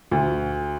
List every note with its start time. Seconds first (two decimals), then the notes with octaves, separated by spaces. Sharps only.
0.11 D2